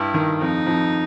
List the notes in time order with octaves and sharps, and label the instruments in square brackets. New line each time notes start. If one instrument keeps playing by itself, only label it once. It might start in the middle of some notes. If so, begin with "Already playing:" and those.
Already playing: [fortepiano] G2 [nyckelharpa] E4
[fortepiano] D#3
[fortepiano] F2 [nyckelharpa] D#4
[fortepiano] F2